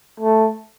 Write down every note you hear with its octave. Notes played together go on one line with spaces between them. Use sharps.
A3